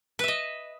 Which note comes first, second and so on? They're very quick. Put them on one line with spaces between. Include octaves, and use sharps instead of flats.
B4 E5 D#5